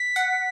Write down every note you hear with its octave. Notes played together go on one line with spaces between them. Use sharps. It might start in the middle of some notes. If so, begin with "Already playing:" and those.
Already playing: B6
F#5